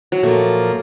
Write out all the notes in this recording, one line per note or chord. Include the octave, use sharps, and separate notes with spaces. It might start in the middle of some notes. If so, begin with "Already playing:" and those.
F#3
A#2 F3 A3 A#3